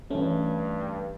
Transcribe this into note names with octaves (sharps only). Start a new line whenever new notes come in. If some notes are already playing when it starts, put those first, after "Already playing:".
G2 E3 A3 C#4